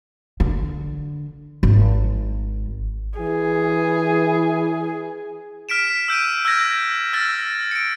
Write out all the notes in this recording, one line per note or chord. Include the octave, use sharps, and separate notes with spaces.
D3
G#1
E3 G#4
F6 B6 D7 E7
E6 G6 D7 D#7
E6 F6 G6 G#6 A#6
E6 F6 A6 A#6
C#7 D7